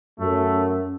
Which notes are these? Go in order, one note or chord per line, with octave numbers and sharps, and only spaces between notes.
F#2 A3